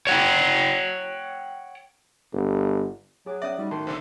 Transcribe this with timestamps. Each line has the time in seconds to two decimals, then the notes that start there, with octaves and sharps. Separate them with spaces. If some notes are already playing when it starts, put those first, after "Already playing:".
0.07 C#5 F#5 G5
2.33 G1
3.26 F#3 G#4 D6
3.42 C#4 D5 E5 D#6
3.59 G3 D#4 F#4
3.71 A2 D#3 D#4 C6
3.87 B1 D3 A4 C5 G#5 D6